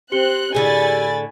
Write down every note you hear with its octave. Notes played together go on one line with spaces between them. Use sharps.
C4 G4 F#6 C#7 G7
A2 D3 G#4 G#5 B5 A6